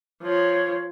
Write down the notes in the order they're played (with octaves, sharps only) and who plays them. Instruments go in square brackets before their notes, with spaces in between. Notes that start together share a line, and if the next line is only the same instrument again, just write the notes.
[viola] F3 [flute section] C#5